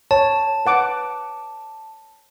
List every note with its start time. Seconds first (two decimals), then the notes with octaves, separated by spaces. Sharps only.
0.11 C#5 A5
0.66 B4 F#5 D6